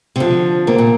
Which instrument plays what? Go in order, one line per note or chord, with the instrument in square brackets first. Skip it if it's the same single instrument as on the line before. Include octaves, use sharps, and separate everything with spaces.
[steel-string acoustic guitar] C3
[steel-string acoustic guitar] D3 [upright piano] F3
[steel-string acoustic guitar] C3 [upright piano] A#3
[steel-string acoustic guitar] A#2